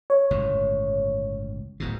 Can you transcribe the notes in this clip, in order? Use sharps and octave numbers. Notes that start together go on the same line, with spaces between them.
C#5
G1 C#2 A2
D1 G#2 B2